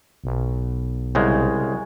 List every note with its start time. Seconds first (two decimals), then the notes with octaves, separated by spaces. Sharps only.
0.24 B1
1.15 C2 C#3 G#3